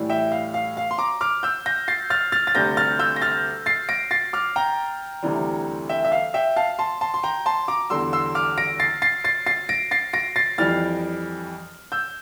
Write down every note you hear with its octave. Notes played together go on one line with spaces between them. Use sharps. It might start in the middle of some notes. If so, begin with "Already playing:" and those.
Already playing: A2 E3 G3
E5 G5
F5
F5
F5
C6
A#5 D6
D6 F6
E6 G6
G6 A#6
A6 C7
F6 A6
F6 A6
A6
D2 C3 G3 G6 A#6
F6 A6
E6 G6
A#6
F6 A6
A6 C7
A#6 D7
A6 C7
D6 F6
G5 A#5
D2 C3 E3 G3
E5 G5
E5
F5
E5 G5
F5 A5
A5 C6
A5 C6
C6
G5 A#5
A5 C6
A#5 D6
E2 D3 G3 C6 E6
C6 E6
D6 F6
A#6 D7
A6 C7
A6 C7
A6 C7
A6 C7
A#6 D7
A6 C7
A#6 D7
A6 C7
F2 E3 G3 F6 A6
E6 G6